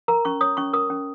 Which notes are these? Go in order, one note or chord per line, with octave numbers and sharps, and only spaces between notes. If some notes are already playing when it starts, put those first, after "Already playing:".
A#4 A#5
C#4 C#6
C#5 D#6
C#4 C#6
A#4 D#6
C#4